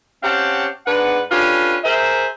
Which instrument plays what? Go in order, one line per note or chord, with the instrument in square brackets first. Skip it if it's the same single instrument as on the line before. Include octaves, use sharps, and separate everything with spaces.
[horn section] C4 C#4 G4 F5 F#5 A5
G#2 D4 B4 F#5
C#4 D4 F4 G4 A4 B4
G#4 A#4 C5 E5